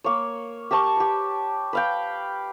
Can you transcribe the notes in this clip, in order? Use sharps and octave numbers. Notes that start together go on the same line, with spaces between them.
A#3 C#5
G4 A#4 A5 C#6
G4 B4
B4 F5 G5